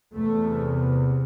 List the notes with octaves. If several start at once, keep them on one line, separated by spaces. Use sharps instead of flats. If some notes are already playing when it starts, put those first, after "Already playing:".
E2 C3 A3